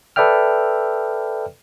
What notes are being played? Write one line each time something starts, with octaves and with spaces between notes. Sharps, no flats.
A4 B4 D5 E5 G5 F6